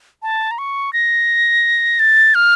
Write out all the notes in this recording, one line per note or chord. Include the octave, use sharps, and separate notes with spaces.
A5
A#5
C#6
A#6
A6
F6